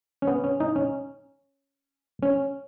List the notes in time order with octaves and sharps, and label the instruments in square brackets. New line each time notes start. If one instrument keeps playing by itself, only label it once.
[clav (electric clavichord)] C#4
B3
C#4
D#4
C#4
C#4